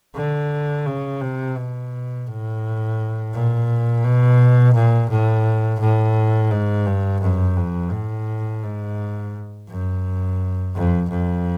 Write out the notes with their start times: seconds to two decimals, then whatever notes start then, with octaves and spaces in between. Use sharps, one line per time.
0.15 D3
0.86 C#3
1.21 C3
1.57 B2
2.27 A2
3.33 A#2
4.04 B2
4.74 A#2
5.10 A2
5.80 A2
6.51 G#2
6.86 G2
7.22 F#2
7.57 F2
7.92 A2
8.63 G#2
9.68 F#2
10.75 F2
11.10 F2